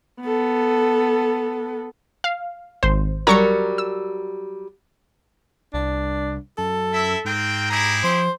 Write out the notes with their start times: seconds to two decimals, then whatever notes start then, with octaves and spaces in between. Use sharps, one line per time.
0.22 B3 A4
2.24 F5
2.83 G#1 C5
3.27 F#3 G3 A#4 A#5 C#6 C#7
3.78 E6
5.74 C2 D4
6.58 F#2 A4
6.92 E4 E5
7.25 G#2 A#3 C4 G5
7.70 E4 G4 G#4 A#5
8.04 F3 C5